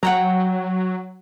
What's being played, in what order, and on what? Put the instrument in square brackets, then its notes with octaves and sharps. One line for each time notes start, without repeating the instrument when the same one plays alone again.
[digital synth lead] F#3 [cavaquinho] F#5 G5 A#5